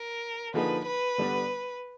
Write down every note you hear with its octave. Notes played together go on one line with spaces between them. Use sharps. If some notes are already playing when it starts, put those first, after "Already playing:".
Already playing: A#4
D3 F3 A#3 D#4 G#4 B4
B4
D3 G3 B3 D4